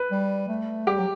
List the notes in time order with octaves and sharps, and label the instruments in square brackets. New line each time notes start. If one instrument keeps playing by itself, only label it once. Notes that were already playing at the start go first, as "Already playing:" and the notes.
Already playing: [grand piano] B4
[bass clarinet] G3
A3
[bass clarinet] G3 [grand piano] G4
[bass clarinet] F#3